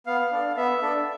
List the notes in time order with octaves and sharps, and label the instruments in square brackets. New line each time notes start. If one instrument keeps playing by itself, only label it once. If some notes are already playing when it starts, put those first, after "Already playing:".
[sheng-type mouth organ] B3 F5
D4 A4
B3 E5
D4 A4